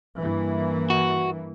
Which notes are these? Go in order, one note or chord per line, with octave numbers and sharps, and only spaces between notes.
G2 E3 A#3
F#4